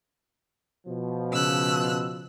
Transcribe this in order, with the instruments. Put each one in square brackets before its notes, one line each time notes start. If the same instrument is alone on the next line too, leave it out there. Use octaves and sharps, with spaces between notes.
[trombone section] B2 F3
[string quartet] C#3 E6 F#6